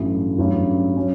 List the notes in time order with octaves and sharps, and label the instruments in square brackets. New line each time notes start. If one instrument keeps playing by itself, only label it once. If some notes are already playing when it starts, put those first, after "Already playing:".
Already playing: [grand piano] A1 G2 F#3 A3 E4
A1 G2 F#3 C#4 F#4
F#3 C#4